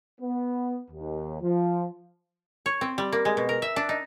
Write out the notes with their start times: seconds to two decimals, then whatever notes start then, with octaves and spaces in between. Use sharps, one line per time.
0.21 B3
0.91 D#2
1.42 F3
2.66 C#5
2.81 C4
2.98 G3
3.12 A#3
3.25 G#3
3.37 B2
3.49 A#4
3.62 E5
3.76 D4
3.89 D#4